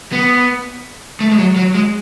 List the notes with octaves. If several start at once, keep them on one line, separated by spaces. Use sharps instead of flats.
B3
A3
G#3
F#3
F#3
G#3